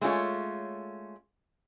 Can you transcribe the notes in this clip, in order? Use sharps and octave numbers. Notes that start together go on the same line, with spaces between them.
G#3 A3 C#4 F4 C#5